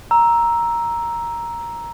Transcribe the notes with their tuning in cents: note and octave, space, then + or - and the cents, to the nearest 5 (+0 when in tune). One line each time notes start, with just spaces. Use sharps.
A#5 +5 E6 +0